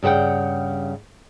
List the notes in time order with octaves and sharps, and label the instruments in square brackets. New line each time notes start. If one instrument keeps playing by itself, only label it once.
[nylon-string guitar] G2 C#3 A4 F#5 G5